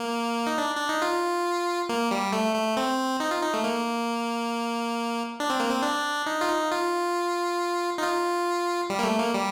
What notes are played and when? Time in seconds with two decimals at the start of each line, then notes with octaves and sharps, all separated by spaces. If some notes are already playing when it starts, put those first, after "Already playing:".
Already playing: A#3
0.47 D#4
0.58 D4
0.76 D4
0.89 D#4
1.02 F4
1.89 A#3
2.11 G3
2.33 A3
2.55 A3
2.77 C4
3.20 D#4
3.31 F4
3.43 D#4
3.54 A3
3.64 A#3
5.40 D4
5.50 C4
5.60 A#3
5.70 C4
5.83 D4
6.26 D#4
6.41 F4
6.49 D#4
6.71 F4
7.98 D#4
8.02 F4
8.90 G3
8.99 A#3
9.04 A3
9.18 A#3
9.33 G3